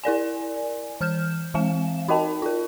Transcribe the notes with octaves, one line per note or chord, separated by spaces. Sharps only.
E4 A#4 D5 G#5
E3 F6 G6 E7
E3 G#3 C4 F5 E7
D#4 F#4 A#4 D#5 G5 A5
F4 A#4